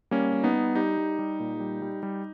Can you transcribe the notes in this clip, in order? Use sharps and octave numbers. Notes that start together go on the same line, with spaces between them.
G3 A#3 C#4
G3
B3 D#4
G3
G3 D#4 G4
G3
G3
A#2
G3
G3
G3